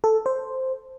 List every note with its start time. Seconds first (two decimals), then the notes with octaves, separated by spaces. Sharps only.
0.04 A4
0.26 C5